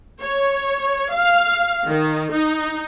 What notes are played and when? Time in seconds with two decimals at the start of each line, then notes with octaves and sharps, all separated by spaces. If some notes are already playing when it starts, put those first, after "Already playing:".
0.23 C#5
1.14 F5
1.87 D#3
2.33 D#4